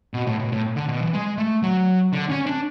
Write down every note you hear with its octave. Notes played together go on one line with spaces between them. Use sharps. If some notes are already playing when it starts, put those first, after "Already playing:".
B2
A2
B2
A2
D3
B2
E3
G#3
A3
F#3
D3
C#4
D4